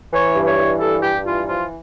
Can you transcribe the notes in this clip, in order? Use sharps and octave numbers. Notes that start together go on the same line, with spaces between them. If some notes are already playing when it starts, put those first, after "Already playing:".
E3 C#5
G2
C#5
E3
G2 A4
G2 G4
E3 F4
F3 F4